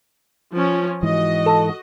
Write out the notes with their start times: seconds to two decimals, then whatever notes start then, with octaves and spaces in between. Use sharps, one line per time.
0.52 F3 C#4
1.03 G#2 E3 F#4 D#5
1.46 A4